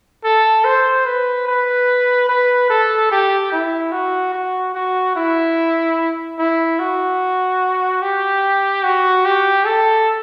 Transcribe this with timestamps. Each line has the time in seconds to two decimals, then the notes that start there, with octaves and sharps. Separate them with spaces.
0.24 A4
0.65 C5
1.06 B4
1.47 B4
2.29 B4
2.70 A4
3.11 G4
3.52 E4
3.92 F#4
4.34 F#4
4.75 F#4
5.16 E4
6.39 E4
6.79 F#4
8.02 G4
8.83 F#4
9.26 G4
9.66 A4